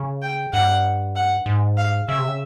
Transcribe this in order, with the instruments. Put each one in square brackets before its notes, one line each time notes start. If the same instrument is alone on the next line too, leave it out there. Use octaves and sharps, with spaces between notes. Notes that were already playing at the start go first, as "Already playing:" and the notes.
Already playing: [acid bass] C#3
[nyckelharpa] G5
[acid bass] G2 [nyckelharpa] F#5
[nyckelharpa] F#5
[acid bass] G#2
[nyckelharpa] F5
[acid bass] C#3 [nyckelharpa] E5
[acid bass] C3
C#3